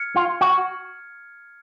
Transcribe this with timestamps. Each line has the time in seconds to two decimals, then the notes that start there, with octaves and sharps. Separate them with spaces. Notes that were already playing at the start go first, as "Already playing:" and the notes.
Already playing: F6 G#6 C#7
0.16 F4
0.41 F#4